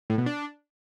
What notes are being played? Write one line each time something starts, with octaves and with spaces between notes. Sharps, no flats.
A2
B2
D4